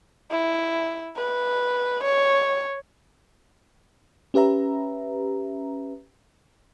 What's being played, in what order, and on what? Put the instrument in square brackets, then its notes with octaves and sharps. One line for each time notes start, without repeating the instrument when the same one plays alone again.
[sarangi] E4
B4
C#5
[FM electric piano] C#4 G4 B4 E5 A#5